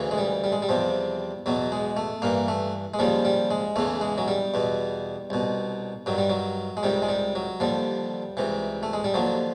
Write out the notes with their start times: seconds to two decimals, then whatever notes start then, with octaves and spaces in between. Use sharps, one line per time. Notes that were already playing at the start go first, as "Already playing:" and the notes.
Already playing: D2 C#3 E3
0.11 G#3
0.18 G3
0.44 G3
0.52 G#3
0.62 G3
0.69 E2 C3 F3
1.46 E2 B2 F#3
1.72 G#3
1.97 A3
2.22 G2 E3 A#3
2.48 A3
2.94 G#3
2.99 D#2 C#3 F3 G3
3.25 G3
3.51 G#3
3.76 E2 C#3 E3 A3
4.01 G#3
4.18 F#3
4.28 G3
4.54 E2 B2
5.30 C2 B2
6.06 G2 D#3 F#3
6.18 G3
6.30 F#3
6.77 G#3
6.83 C#2 C3 D#3 G3
7.02 G#3
7.09 G3
7.35 F#3
7.60 D#2 D3 F3 G3
8.37 C#2 C3 E3
8.83 A3
8.93 G#3
9.04 G3
9.14 D#2 D3 F3 F#3